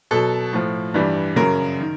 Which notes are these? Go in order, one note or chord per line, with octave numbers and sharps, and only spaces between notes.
B2 F#3 A4
A2 F3
G2 E3 G3
F#2 C#3 F#3 A#4
D#3